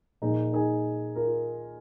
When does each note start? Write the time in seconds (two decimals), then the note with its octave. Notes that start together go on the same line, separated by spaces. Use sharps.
0.22 A#2 F3 D#4 G#4
0.53 D#4 G#4
1.15 F4 A#4